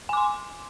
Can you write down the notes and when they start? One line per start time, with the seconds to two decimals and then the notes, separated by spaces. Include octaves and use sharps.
0.09 G#5
0.13 D6
0.17 C6